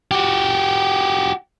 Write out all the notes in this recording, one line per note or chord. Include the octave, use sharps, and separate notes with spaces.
F#4 G4